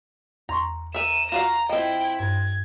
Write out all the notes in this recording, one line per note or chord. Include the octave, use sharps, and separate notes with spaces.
E2 A#5 C6 C#6
A#4 E5 D#7 E7
F4 F#4 F5 A#5
F3 C4 E4 D#5 G5
G2 G#6